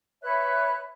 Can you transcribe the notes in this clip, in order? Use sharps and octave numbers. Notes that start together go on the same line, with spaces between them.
B4 C#5 E5 F#6